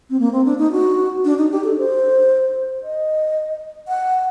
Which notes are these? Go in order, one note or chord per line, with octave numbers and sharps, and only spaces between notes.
C4
A#3
C4
D4
D#4
F#4
D4
D#4
G4
A4
C5
D#5
F#5